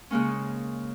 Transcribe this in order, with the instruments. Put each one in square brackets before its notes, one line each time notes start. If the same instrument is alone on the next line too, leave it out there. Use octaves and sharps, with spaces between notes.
[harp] C#3 G#3 A#3 C#4